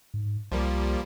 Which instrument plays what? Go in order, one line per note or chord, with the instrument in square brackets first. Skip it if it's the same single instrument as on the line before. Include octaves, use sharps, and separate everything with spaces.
[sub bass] G#2
[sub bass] C2 [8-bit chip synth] F3 G3 A#3